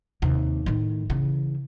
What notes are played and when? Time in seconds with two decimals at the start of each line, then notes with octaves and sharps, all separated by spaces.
0.22 D#2 C3
0.66 A2 D#3
1.10 C#3 E3